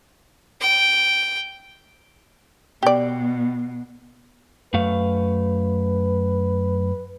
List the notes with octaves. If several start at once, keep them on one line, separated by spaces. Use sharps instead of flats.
G5
B2 G4 D5
F#2 A3 B4 F5